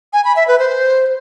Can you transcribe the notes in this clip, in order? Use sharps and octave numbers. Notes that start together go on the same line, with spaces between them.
G#5
B5
E5
B4
C5